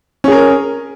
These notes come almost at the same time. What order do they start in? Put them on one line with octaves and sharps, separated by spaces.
C#4 G#4 A#4